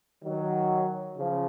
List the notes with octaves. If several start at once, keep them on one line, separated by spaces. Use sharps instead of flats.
D#3 F#3
C#3 F3